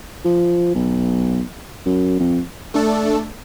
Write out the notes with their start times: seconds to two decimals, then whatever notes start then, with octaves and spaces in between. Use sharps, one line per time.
0.25 F3
0.75 B1
1.86 F#2
2.20 F2
2.74 A3 D4 A4